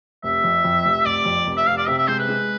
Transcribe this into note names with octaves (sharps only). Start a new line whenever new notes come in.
F1 E5
F2
F2
F1
F1 D5
F2
F1
E5
F1 F5
D5
C3 E5
E5
G#3 C5
B4
G#3